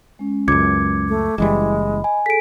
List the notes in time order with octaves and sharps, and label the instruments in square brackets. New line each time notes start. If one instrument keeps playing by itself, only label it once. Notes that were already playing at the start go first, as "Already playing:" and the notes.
[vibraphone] G#3 C#4
[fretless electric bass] C#2 F#2 [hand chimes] D6 G#6 C#7
[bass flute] A3
[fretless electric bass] F#1 E3 G3 [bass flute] G#3 [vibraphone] D#5 B5
[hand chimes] G#5
[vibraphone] G#4 A4 [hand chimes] B6 D7